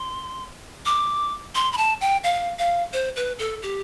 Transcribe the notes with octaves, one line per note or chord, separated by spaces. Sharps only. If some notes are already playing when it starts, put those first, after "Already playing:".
Already playing: C6
D6
C6
B5
A5
G5
F5
F5
C5
B4
A4
G4